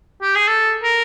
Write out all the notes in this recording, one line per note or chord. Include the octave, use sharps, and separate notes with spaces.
G4
G#4
A4
A#4